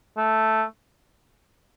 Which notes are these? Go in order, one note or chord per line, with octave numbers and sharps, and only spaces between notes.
A3